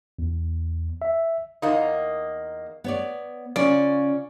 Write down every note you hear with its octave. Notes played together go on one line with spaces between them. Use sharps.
E2
E5
E2 A#3 D#4
B3 C#5 D5
C#3 C#4 F4 D5